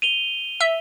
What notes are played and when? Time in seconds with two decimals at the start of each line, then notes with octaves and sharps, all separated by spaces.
0.02 D#7 F7 G7
0.61 E5